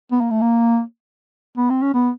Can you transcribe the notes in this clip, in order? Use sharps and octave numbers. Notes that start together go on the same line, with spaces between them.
B3
A#3
A3
A#3
B3
C4
C#4
B3